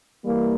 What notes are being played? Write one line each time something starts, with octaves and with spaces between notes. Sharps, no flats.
E3 G3 A#3